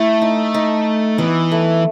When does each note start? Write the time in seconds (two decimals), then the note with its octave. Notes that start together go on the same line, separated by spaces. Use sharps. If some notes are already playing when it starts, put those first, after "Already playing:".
Already playing: A3 E4
0.22 D#4
0.54 D#4
1.18 E3 B3
1.51 A3